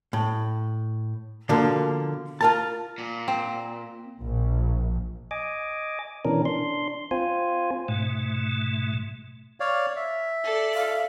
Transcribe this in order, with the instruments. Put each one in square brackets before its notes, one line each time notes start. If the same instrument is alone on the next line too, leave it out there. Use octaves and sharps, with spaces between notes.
[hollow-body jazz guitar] A2
B2 D3 F3 A#3
F4 A#4 A5
[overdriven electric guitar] A#2
[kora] C4
[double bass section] A#1
[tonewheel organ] D#5 G#5 D6
B2 E3 C#4 D4 A#4
D4 C6
C4 F4 C5 G#5
G#2 B2 A3
[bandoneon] C#5 D5 F5
E5
[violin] A4 D5
[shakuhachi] F5